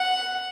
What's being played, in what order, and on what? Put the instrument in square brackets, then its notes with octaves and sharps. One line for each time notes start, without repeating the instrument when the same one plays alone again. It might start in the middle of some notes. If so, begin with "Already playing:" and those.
Already playing: [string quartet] F#5